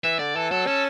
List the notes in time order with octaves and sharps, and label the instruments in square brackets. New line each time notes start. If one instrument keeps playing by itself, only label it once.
[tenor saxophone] E3 [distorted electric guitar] E5
[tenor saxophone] D3 [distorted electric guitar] D5
[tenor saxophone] E3 [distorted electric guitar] A4
[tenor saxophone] F#3 [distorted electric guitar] A4
[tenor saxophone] C#4 [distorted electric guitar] A4